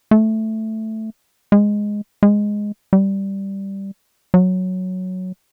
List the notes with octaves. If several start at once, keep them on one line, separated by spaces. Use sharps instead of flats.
A3
G#3
G#3
G3
F#3